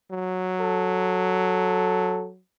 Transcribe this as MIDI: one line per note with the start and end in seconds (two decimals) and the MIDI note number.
0.11 2.40 54
0.61 2.29 69